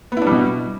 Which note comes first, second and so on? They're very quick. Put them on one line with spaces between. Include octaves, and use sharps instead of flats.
B3 E4 D4 G3 B2